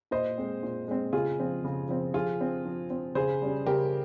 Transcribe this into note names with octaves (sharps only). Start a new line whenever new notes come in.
A#2 C5 D#5
G#3 C4
A#2
G#3 C4
C#3 F4 G#4
F3 C4
C#3
F3 C4
F3 F4 G#4
C4
F3
C4
C#3 G#4 C5
G3 C#4
C#3 G4 A#4